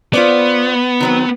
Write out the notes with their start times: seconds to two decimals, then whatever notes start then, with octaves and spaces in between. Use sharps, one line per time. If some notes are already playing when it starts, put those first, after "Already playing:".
0.14 B3 F4 C5 D5
1.00 D#3 F#3 C4